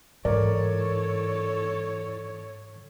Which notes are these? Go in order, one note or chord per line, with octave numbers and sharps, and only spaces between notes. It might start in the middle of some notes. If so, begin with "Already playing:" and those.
G#2 E3 A4 A#4 C#5 D5